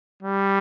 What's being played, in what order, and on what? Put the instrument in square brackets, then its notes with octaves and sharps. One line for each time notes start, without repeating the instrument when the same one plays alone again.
[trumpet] G3